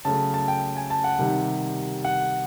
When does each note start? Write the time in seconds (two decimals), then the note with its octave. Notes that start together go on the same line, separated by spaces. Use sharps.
0.05 C#3 F#3 A3 A5
0.34 A5
0.48 G5
0.77 G#5
0.90 A5
1.04 F#5
1.19 C3 D#3 G3
2.05 F#5